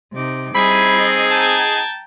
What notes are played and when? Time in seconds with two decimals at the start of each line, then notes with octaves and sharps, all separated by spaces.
0.14 C3 D#4 D6
0.55 G3 C4 D#4 E4 G#4 G#5 B5
0.98 D#5 A6
1.31 G5 A5 A#5 G#6